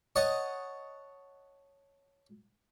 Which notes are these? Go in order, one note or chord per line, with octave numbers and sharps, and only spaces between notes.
C#5 D#5 F#5 A5